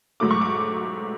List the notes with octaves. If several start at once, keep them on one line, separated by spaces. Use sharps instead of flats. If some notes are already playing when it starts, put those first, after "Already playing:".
G#2 F#3 A3 D6
C#6
D6